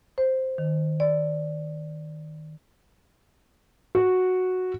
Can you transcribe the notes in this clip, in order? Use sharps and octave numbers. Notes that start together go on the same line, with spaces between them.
C5
D#3
D5
F#4